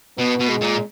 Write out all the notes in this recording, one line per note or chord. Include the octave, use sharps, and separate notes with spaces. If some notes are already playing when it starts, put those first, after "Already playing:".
B2 B3
B2
G#3
A#2